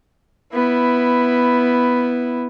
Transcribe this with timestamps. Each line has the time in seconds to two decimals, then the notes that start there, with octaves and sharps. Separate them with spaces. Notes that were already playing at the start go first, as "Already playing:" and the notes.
0.53 B3 E4